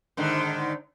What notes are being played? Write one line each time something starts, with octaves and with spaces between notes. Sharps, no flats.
G#2 D3 D#3